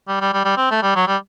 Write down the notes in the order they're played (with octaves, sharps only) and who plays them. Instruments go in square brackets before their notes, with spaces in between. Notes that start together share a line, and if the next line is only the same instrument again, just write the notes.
[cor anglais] G3
G3
G3
G3
C4
A3
G3
F#3
G3